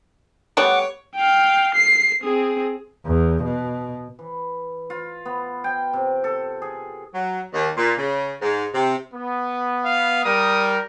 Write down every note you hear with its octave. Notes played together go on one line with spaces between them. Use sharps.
G3 A3 B3 C#5 F#5 D6
F5 G5
C7
C4 G#4
E2
B2
E3
F4
B3
G5
C3
A4
G#4
F#3
D#2
A#2
C#3
G#2
C3
B3
F5
G3 A#4 D#6